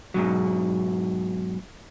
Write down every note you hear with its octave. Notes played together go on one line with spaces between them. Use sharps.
G#2 B2 F#3